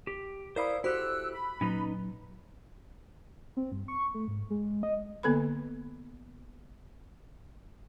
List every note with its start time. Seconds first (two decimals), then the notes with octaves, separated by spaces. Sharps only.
0.07 G4
0.56 E4 A#4 C5 D5 F5 B5 D#6
0.84 E4 F#4 G4 A4 C5 E6 F#6
1.32 B5
1.61 A#2 F#3 C#4 D#4 B4
3.57 C4
3.72 G2
3.88 C#6
4.14 A3
4.28 G#2
4.50 G#3
4.83 D#5
5.23 D3 A#3 B3 A4 B4 B5